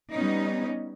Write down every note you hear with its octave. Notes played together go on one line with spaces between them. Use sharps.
G3 B3 C#4 D#4